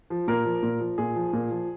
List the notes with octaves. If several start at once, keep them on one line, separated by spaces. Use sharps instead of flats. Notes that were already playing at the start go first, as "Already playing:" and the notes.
F3
A#2 A#4
F3
A#2
F3
A#2 G#4
F3
A#2
F3